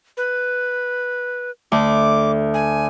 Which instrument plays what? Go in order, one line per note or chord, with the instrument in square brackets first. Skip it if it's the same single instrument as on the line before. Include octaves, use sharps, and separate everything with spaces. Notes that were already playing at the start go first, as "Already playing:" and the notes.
[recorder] B4
[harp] D2 [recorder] D6
[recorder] G#5